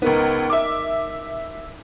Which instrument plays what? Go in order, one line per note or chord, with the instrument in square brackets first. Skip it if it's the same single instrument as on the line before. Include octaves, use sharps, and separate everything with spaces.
[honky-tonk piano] C#2 B3 [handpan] D#4 A#4
[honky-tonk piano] E5 D6